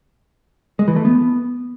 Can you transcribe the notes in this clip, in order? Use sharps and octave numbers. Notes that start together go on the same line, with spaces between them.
G#3
E3
A3
B3